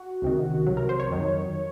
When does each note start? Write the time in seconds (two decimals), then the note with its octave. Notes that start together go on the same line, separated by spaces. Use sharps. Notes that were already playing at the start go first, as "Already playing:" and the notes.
Already playing: F#4
0.22 C#2 C3 D#3
0.66 C2 C3 F#3
0.77 A#4
0.89 C5
1.00 C#5
1.10 F2 D#3 F#3